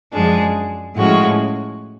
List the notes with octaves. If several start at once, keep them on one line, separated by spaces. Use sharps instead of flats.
F#2 F3 G#3 D4 G#4
A2 F3 G#3 C#4 F#4